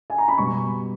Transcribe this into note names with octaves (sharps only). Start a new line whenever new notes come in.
G#5
A#5
B5
B2 G3 C#6